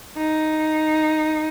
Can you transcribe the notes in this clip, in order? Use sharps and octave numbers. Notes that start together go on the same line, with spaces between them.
D#4